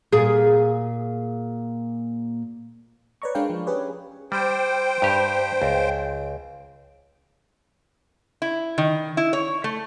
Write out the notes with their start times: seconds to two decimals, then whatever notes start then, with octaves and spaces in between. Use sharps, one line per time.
0.13 A#2 G#4
3.22 B4 C#5 D5 A#5 C#6
3.35 G#3 D4 A#4 D5 F5 G5
3.50 F3
3.67 C#4 G4 G#4 B4 C#5
4.32 G3 C5 G5
5.02 G2 G4
5.62 C#2
8.42 E4
8.78 D#3
9.17 E4
9.33 C#5
9.64 A3